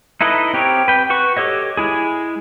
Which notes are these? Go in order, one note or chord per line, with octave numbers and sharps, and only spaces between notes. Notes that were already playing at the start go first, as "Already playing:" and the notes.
D#4 E4 A4 B4 D#5
C4 G4 A#4 C#5
B4 G5
F#4 B4 C#6
G4 A4 C#5 D#5
G#3 E4 G#4